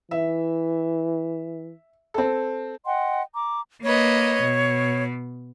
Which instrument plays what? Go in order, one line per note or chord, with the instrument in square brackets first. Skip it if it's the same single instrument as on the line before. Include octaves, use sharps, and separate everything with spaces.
[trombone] E3 [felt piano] E5
[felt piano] C4 A4
[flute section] D#5 F#5 G5 C6
A#5 D6
[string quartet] A#3 B4 D#5 [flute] C#5
[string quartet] B2